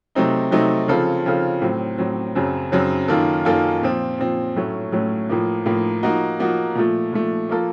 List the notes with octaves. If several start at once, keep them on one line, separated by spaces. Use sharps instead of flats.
C3 F#3 A3 C4 D#4
C3 F#3 A3 C4 D#4
C#3 F3 C4 F4 A4
C#3 F3 C4 F4 A4
A2 F#3 C4
A2 F#3 C4
F#2 C#3 F#3 C4
F#2 C#3 F#3 C4
F#2 D#3 A#3 F4 A4
F#2 D#3 A#3 F4 A4
A#2 F3 C4
A#2 F3 C4
A2 F#3 A3 C#4
A2 F#3 A3 C#4
A2 F3 A#3
A2 F3 A#3
F3 A#3 D#4 F#4
F3 A#3 D#4 F#4
A#2 F3 A3
A#2 F3 A3
F3 A#3 F4 A4